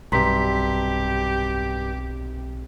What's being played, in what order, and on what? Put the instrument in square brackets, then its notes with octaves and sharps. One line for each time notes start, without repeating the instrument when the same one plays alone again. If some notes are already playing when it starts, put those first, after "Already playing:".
[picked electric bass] B1 C3 [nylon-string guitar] G2 [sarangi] G4 [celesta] A#5 C6 B6